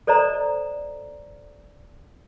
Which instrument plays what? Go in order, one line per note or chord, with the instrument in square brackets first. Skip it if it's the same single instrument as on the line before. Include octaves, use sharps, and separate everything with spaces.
[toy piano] A4 C5 D5 D#5 A#5